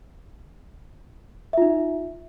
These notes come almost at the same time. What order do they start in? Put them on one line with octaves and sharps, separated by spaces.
E5 F4 D#4